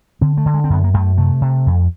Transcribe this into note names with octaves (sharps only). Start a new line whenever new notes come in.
D3 C4
A3
D3
G#3
C4
F#2 B3
A#3
F#2 A3
C3 A3
C3
F2